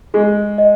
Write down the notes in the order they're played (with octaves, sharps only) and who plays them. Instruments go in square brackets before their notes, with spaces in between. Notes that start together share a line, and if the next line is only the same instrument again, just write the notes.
[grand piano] G#3 [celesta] G#4
[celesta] D#5